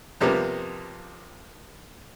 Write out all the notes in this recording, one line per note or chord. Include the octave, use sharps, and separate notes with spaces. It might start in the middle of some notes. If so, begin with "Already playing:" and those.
F2 C3 G3 A#3 B3